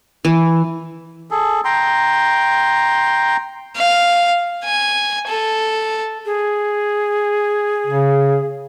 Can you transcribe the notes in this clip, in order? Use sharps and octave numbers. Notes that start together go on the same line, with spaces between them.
E3
G#4 A4
G5 A#5 C6
F5
G#5
A4
G#4
C#3